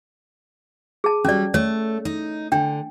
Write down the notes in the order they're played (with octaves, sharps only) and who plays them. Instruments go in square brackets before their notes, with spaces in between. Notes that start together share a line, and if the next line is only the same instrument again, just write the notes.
[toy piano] G#4 A5
[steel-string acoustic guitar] F#3 G3 [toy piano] C#4 D5
[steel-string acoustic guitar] A3 [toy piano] C#5
[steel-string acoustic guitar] D#4
[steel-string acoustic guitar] D3 [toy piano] D4 G5